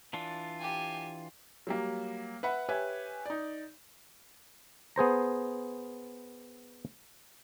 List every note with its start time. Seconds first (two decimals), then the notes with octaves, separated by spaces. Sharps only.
0.13 E3 D4 F4
0.59 G4 G#5
1.67 F#3 G3 A#3
2.43 B4 E5 F#5 B5
2.69 G4 B4 C#5 E5 G#5
3.26 D#4 D5
4.96 B3 G#4 C5 A#5